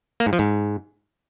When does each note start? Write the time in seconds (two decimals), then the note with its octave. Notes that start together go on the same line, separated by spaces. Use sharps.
0.20 A#3
0.26 G#2
0.33 F3
0.39 G#2